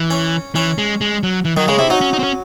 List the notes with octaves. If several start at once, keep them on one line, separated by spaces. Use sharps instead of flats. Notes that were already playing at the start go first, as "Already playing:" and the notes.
Already playing: E3
C#4
E3 C#4
G#3
G#3
F#3
E3
D#3 F#3
C#3 G#3
C3 E4
F#3 D#4
C#4
D#4
C4
C#4